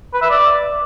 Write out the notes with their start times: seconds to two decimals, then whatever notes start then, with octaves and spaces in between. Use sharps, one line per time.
0.13 B4
0.22 E5
0.30 D5